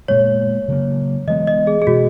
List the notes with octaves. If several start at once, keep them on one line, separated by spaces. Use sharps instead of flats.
A#2 G#3 B3 C#5
C#3 F#3 A#3
E3 G#3 B3 D#5
D#5
G#4
G#4
B2 G#3 B3 F#4